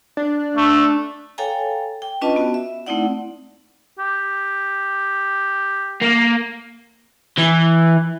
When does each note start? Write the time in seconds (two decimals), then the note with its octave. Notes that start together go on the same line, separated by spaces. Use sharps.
0.17 D4
0.57 A3
1.38 A4 C#5 F5 G5 G#5 A#5
2.02 G5
2.21 C#4 D4 F4 B4 D#5 A5
2.36 B3 F#4
2.54 E5
2.87 A3 C4 D#4 E4 D5 F#5
3.99 G4
6.02 A#3
7.38 E3